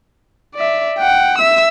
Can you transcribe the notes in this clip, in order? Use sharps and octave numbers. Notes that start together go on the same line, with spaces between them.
D5 E5
F#5 G5
E5 E6